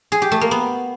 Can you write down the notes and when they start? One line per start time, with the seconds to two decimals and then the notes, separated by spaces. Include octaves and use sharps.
0.12 G#4
0.22 G4
0.32 A3
0.41 A#3
0.51 B3